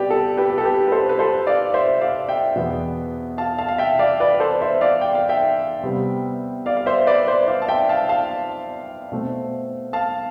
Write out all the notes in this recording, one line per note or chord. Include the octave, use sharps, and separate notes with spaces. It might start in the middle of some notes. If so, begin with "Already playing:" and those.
Already playing: C3 G3 B3 G4 B4 D5
A4
G4 B4
G4
A4
G4 B4
B4
A4 C5
B4
A4 C5
D5 F5
C5 E5
D5 F5
E5 G5
E2 B2 B3
F5 A5
F5 A5
F5
E5 G5
D5 F5
B4 D5
A4 C5
C5 E5
D5 F5
G5
F5
E5 G5
C3 G3 B3
D5 F5
F5
C5 E5
B4 D5
C5 E5
D5 F5
A5
E5 G5
F5 A5
F5 A5
B2 A3 C4
F5 A5